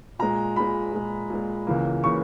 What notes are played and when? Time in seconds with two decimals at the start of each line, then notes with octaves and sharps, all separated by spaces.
0.19 A#2 G#3 A#5
0.56 A#2 G#3 B5
0.93 A#2 G#3
1.30 A#2 G#3
1.67 C#2 C#3 E3 A#3
2.04 C#3 E3 A#3 C#6